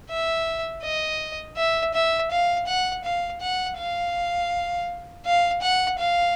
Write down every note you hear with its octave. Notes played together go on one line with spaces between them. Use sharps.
E5
D#5
E5
E5
F5
F#5
F5
F#5
F5
F5
F#5
F5